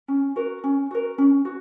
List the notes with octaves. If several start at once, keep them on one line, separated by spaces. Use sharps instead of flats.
C#4
F#4 A#4
C#4
F#4 A#4
C#4
F#4